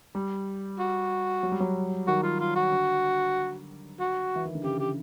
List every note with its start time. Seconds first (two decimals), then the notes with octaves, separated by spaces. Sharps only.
0.15 G3
0.79 F#4
1.43 F#3
1.52 G3
1.60 F#3
2.07 D#3 F#4
2.23 F4
2.40 F4
2.56 F#4
2.72 D3
4.00 F#4
4.35 E3
4.45 D#3
4.55 D3
4.64 C#3 G4
4.79 G4